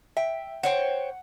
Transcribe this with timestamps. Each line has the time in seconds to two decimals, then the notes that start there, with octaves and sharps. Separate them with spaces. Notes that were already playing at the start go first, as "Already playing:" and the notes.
0.17 E5 G5
0.63 C5 C#5 F#5 G5